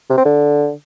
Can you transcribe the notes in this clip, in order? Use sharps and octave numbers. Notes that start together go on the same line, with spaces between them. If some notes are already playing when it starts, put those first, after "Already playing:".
C3
C4
D3